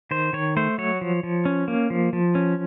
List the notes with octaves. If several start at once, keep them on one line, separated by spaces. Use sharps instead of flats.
D#3 C5
D#3 C#5
A3 C5
F#3 C#5
F3
F3
C#4
A#3
F3
F3
C#4